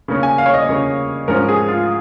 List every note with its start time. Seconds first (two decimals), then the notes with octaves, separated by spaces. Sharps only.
0.08 C#3 A#3 C#4
0.23 G#5
0.38 F5
0.46 C#5
0.54 D#5
0.69 C#3 A#3 C#4
1.28 G#2 F3 C#4 A#4
1.49 G#4
1.68 F4